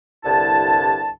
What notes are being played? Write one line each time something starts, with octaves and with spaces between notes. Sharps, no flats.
C2 G2 D3 E4 A5